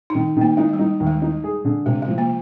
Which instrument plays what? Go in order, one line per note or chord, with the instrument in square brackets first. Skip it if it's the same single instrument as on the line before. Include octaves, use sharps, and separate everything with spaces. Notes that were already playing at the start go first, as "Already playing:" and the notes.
[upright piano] D#3 [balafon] D#4
[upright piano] D#3 [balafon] A#3
[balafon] G#3 [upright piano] D#4
[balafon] G3
[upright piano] D#4
D#2
[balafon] G#3
[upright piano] D#4
G#4
D3
[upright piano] C3 [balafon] G#3
[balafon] G#3
[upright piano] F3
[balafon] A#3